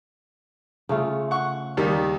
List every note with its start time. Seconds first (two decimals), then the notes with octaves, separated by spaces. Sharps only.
0.89 C#3 A3 F4
1.31 F#5 C#6
1.77 D#2 D#3 G3